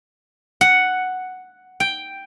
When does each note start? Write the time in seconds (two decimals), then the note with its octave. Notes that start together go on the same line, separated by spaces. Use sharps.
0.61 F#5
1.80 G5